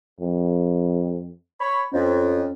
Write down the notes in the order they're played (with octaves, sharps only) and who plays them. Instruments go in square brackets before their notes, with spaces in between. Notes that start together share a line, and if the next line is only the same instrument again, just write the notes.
[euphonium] F2
[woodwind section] C#5 B5
[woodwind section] F2 [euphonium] C#4